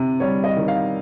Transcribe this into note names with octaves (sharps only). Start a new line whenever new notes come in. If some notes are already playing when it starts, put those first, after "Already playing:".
Already playing: C3
G3 C#5
D#5
D#3
F5